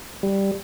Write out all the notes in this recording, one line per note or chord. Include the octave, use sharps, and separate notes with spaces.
G3